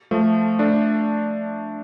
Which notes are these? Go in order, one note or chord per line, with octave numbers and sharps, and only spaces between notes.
F3 A3
A3 D4